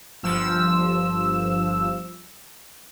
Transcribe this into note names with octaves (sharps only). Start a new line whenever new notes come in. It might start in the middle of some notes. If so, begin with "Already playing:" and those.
G1 F3 E6